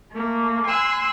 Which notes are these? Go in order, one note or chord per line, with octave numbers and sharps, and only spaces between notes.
A3 A#3
G#5 C6 E6 F#6